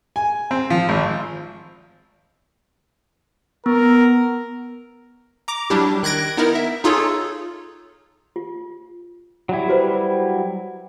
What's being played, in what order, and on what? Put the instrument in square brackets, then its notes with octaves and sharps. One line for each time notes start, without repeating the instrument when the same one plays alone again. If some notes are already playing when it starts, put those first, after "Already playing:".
[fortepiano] G#5
C4
F3
G#1
[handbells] B3 [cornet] A#4
[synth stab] A#5 D6
F#3 G3 D4 E4 G4
D#3 F#6 G#6 A#6 D7
B3 D#4 E4 A#4
E5
D#4 F4 G#4 A4 C#5
[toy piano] F4
[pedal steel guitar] F#3 G3 E4
[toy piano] F#4 B4 C5